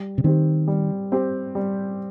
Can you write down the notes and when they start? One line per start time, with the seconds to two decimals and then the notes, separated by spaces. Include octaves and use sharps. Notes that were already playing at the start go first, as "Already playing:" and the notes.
Already playing: G3
0.18 C3
0.24 D#3 C4 G4
0.68 G3
1.12 C4 G4
1.55 G3